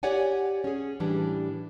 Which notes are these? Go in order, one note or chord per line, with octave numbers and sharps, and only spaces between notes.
G4 C#5 D5 F#5 G#5
C#4 G#4
A2 E3 G3 D4